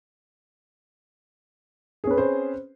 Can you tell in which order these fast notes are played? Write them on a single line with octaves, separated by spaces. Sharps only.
G#4 C#4 B4 C4 C5